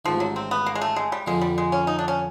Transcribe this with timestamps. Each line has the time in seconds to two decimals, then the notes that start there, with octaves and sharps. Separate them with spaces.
0.05 A1 G#2 D#3 F3
0.20 F#3
0.36 C4
0.51 B3
0.66 A#3
0.75 G#3
0.81 A3
0.96 G#3
1.12 G3
1.26 F2 D3 F3 G#3 A#3
1.41 G3
1.58 G#3
1.72 C#4
1.87 D#4
1.99 D4
2.08 C#4